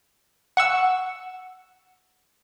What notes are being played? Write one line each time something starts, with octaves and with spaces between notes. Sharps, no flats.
F#5 C#6 E6